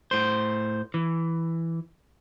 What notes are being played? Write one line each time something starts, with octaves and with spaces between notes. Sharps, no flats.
A2 C5
E3